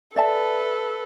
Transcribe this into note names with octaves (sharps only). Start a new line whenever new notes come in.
A4 B4 D5 E5 A5